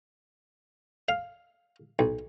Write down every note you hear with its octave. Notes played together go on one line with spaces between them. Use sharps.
F5
B1